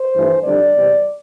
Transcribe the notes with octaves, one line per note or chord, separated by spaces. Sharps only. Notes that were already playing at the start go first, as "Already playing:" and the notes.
Already playing: C5
G2 E3 A3
F2 D3 G3 D4 D5
E2 C3 G3 C4